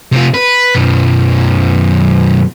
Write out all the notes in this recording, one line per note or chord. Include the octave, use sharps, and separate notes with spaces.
C3 F4
B4
B1 F#2